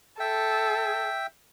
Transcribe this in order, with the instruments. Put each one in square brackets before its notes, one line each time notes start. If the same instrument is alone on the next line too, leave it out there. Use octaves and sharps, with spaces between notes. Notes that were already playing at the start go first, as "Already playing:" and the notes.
[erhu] A4 [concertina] E5 G5